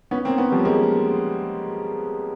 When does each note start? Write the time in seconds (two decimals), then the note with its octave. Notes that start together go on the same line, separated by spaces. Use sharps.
0.11 B3 C#4
0.25 A#3 C4
0.38 B3 C#4
0.52 F3 G3
0.65 G#3 A#3